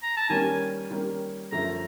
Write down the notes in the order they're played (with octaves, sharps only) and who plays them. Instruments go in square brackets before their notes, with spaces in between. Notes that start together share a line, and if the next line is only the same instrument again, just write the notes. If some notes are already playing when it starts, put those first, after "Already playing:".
[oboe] A#5
A5
[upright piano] D#3 G3 A#3 C#4 [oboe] G#5
[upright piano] D#3 G3 A#3 C#4
[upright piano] F#2 D3 F3 A3 [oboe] A#5